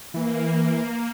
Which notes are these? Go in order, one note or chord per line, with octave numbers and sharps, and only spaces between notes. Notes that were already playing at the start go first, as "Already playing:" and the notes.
E3 A#3